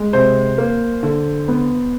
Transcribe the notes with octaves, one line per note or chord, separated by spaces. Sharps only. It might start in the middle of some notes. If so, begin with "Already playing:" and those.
Already playing: G#3
C3 C5
A#3
D3
B3